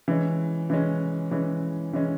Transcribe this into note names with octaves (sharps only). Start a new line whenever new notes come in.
E3 G#3 C#4
E3 G#3 C#4
E3 G#3 C#4
E3 G#3 C#4